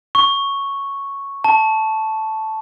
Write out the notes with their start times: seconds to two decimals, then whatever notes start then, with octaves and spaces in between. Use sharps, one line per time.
0.15 C#6
1.44 A5